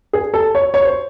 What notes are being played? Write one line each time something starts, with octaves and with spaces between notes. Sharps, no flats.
G#4
A4
C#5
C#5
C5